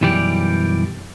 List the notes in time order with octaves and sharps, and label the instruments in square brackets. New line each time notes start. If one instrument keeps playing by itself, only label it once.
[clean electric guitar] B1 F#2 E3 G3 G4 D5